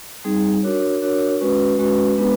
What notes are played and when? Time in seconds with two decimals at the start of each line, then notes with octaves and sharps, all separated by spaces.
0.24 G3 C4 D#4 G#4
0.63 D4 F#4 A#4 C#5
1.02 D4 F#4 A#4 C#5
1.41 G#3 C#4 F#4 B4
1.79 G#3 C#4 F#4 B4
2.18 G#3 B3 D4 G4 B4